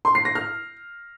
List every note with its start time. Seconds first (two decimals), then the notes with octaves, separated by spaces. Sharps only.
0.05 C6
0.15 C7
0.25 A#6
0.35 F6